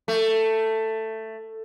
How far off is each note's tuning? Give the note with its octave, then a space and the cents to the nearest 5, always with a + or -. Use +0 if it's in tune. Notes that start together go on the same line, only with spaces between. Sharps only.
A3 +10